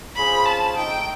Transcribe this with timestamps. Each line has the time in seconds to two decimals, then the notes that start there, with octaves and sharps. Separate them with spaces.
0.15 C#4 F4 G#4 C5 B5
0.46 A5
0.77 A3 C4 D#4 G5